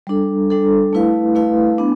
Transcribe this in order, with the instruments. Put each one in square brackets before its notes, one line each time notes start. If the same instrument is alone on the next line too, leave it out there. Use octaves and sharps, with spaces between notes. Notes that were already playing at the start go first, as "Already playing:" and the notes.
[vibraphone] G3 D4 A4
G3 D4 A4
A3 E4 B4 F5
A3 E4 B4 F5
B3 D4